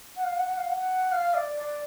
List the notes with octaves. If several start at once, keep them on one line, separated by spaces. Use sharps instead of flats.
F#5
F5
F#5
F#5
F5
F#5
F5
D5
D5